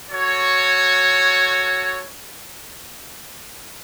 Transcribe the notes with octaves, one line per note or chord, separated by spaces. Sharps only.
F#4 A4 C#5